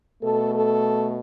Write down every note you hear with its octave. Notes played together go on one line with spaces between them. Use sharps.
B2 A3 A4
A4